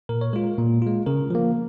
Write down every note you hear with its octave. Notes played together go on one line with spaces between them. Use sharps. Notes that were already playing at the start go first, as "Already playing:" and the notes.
A#2 A#4
C#5
G#3 F4 A#4
A#2
G#3 F4
C#3 A#4
F3 A#3